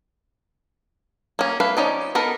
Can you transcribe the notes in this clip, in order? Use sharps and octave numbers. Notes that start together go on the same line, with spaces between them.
A#3 C#4
A3 B4 F5
F3 C#4 D#4 D5
B3 D#4 A4 A#4